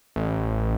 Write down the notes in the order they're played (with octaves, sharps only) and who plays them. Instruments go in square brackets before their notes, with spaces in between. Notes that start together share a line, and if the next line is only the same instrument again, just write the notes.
[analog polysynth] A1